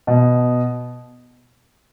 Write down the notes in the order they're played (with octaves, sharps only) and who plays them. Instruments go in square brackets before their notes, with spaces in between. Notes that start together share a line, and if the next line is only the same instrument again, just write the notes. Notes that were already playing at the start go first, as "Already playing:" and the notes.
[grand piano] B2